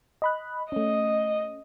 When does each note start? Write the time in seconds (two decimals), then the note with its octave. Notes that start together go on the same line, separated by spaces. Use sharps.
0.22 D#5 B5 F#6
0.72 A3 C#4 D#5